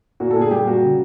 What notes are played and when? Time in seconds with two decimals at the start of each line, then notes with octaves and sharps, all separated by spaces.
0.20 A#2 F#4
0.31 A4
0.36 A#2
0.41 G#4
0.51 G3 G4
0.66 A#3 F#4
0.83 C#3